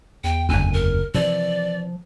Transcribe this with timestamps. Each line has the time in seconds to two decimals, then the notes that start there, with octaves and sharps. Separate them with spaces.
0.24 E2 G5
0.49 F#1 D2 G#5
0.73 A#4
1.14 C3 E3 F3 D5